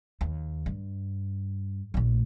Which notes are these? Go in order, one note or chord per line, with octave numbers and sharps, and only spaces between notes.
D#2
G2
A#1 A3